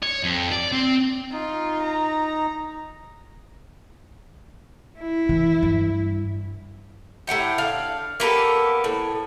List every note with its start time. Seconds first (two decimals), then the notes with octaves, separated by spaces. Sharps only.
0.03 C#5
0.23 F2
0.52 D5
0.72 C4
1.32 D#4 F4
1.82 A#5
4.99 E4
5.29 E3
5.63 G2
7.27 A2 G4 F#5 G5
7.58 D4 F5
8.20 A#3 B3 G4 A4
8.84 A2